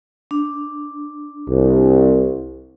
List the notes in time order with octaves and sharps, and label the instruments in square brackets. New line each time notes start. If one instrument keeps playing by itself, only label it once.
[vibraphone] D4
[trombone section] C2